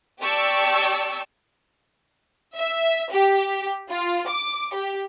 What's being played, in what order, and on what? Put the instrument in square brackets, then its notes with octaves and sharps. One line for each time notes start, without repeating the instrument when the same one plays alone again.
[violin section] G4 D5 G5 A5 C#6 E6
E5
G4
F4
D6
G4